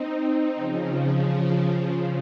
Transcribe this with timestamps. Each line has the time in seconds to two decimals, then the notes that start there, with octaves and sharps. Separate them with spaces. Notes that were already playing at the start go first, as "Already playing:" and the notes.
Already playing: C4 D#4
0.16 C4 D#4
0.56 C#3 F3
0.96 C#3 F3